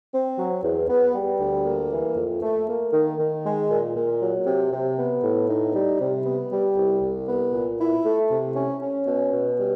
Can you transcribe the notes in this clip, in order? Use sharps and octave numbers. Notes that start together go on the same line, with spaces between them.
C4
F#3
E2
B3
G3
D2
A#3
E3
F2
A3
A#3
D#3
D#3
G#3
A#2
A#2
F#3
C3
C3
B3
A2
D#4
G3
C3
B3
G3
C2
C2
B3
A#2
E4
A3
C3
C#4
C#4
B2
B2
G3